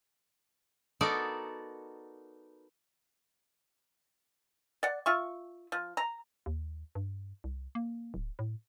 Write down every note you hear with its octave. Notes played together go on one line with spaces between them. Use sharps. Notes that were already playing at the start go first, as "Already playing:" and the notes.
B3 D#4 F#4 A4 A#4 D5
D5 F#5
F4 E5 C#6
F3
A#5
D#2
G2
C2
A#3
D1
A2